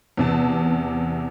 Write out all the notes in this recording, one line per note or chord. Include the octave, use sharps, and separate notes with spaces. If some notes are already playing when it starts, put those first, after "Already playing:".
E2 C3 A5